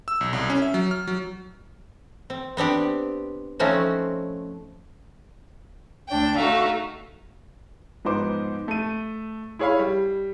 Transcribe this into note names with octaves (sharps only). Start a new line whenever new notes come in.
E6
B1
C2
C#4
E5
F#3
F6
F#3
C4
B3 C4 D4 G4
F3 A3 C4 C#4 D#4 F#4
D2 D4 G5
A3 D#4 F#4 E5 F5
G#2 F3 B3 D#4 C5 D6
A3 D#7
E4 G#4 C#5 F5 B5
G3